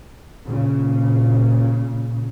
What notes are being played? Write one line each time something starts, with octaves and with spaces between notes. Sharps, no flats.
A#2 C#3